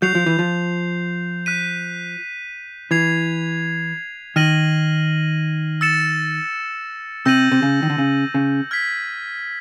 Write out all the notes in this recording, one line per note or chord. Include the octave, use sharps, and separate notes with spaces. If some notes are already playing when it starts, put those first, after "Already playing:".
F#3 G6 C7 F7
F3
E3
F3
F#6 B6 D#7
E3 G#6 C7 F7
D#3 F6 A#6 D#7 F#7
E6 A6 C#7 E7
C3 E6 G6 A#6 D#7 F#7
C3
C#3
D#3
D3
C#3
C#3
F6 G#6 B6